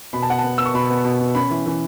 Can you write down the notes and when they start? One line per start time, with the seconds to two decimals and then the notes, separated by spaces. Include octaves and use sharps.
0.13 B2 B5
0.22 A5
0.29 B3 F#5
0.38 A5
0.44 B3
0.58 B3 E6
0.65 C#6
0.74 B2 B5
0.90 B3
1.05 B2
1.20 B2
1.35 C#4 B5
1.50 E3
1.66 E3